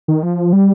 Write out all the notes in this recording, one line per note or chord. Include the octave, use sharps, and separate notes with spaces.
D#3
F3
G3